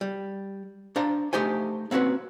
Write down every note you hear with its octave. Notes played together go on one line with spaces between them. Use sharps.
G3
D4 C5 F5 A#5
A3 D#4 G4 C5 G#5
A#3 C4 C#4 F#4 B4